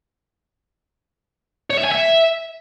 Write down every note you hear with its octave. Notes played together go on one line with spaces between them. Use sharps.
C#5
E5
G#5
E5